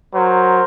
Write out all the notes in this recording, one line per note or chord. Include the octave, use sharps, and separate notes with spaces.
F#3 A#4 C5